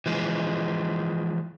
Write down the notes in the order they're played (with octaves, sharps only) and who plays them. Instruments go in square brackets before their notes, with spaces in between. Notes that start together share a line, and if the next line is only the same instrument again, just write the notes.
[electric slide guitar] E3 F3 G#3